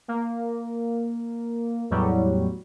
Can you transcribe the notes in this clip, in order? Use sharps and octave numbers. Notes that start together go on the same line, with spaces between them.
A#3
E2 A2 F#3 G3